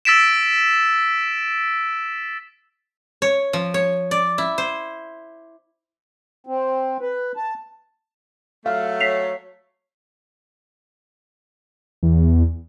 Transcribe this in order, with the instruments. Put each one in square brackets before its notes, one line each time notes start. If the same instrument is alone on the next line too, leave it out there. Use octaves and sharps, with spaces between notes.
[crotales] E6 A6 B6 D7 E7
[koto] C#5
F3
C#5
D5
E4
C5
[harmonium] C4
B4
A5
[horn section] F#3 A3 [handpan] F5
[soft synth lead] C#5 [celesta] B6 C7 F7
[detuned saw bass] E2